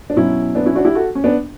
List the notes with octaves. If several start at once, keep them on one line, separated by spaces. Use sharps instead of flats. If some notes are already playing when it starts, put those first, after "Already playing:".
D4
B2 F#3 C#4 E4
B3 D4
C#4 E4
D4 F#4
E4 G4
F#4 A4
C#4
B3 D4